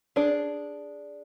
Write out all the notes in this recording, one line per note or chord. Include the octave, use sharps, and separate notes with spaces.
D4 G#4 D5